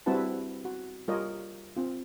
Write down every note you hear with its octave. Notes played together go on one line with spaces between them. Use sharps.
G3 C4 E4 F#4 B4 A5
F#4
G3 F4 A#4 C#5 D#5
C4 F4